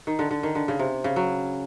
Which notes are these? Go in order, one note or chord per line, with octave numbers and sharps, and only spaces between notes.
D#3
D3
D3
D#3
D3
C#3
C3
C#3
F#3